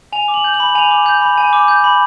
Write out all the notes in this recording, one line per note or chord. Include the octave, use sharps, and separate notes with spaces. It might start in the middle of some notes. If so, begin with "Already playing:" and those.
G#5 F7
D6
F#7
G6
F#7
B5
G#5 F7
D6
G6
B5
G#5
D6
G6
B5